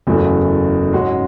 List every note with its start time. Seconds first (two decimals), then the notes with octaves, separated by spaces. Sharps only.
0.07 F#1 E2 C#3 F#3 A3
0.93 G#2 G#3 C#4 F#4